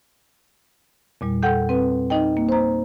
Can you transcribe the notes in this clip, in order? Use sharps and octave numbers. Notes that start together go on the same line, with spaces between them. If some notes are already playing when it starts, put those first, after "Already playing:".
E2 A#2 G3
A4 F#5 G5 G6
C4 B4
D#4 D#5 G5
A#3
C5 A#5